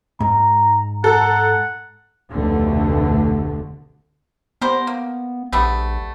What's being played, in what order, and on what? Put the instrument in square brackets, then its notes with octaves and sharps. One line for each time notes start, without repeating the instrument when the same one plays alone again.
[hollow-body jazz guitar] G#2 [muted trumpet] A#5
[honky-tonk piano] A4 [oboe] F#5 [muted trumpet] A#5
[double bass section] F1 D2 B2 D3 A3
[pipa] G3 A#4 C5 [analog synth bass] B3
[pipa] A#3
[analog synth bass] A#1 [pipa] G3 A3 B3